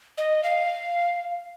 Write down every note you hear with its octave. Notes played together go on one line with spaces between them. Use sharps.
D#5
F5